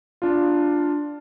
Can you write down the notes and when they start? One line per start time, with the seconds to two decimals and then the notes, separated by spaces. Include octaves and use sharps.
0.22 D4 F4